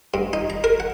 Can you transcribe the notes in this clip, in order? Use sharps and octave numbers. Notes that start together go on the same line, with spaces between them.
G2
D#4
A#5
A#4
F#5